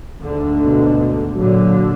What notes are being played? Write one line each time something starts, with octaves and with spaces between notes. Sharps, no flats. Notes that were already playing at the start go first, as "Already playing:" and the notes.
D2 G#2 D3
B2
A#2 D3 F#3